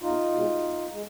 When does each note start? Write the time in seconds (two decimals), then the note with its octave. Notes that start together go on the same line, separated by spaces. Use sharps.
0.02 E2 D#4 F4
0.32 B2 G#3
0.62 E2
0.92 G#3